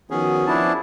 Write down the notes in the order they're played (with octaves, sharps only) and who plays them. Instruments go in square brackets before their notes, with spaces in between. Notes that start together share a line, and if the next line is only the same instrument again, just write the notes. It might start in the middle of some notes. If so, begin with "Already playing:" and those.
[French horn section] D#3 F3 F#4 [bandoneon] B3 C#4 G#4
[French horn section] F3 [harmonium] D4 E4 A5